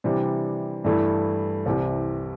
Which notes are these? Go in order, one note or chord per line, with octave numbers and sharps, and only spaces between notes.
C3 E3 G3 D4
G2 E3 A3 E4
C2 C3 E3